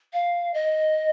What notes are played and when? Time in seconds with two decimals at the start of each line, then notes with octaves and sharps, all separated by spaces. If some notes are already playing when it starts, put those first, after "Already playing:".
0.13 F5
0.54 D#5